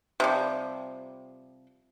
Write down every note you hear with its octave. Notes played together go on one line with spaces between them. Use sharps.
C3 F3 G3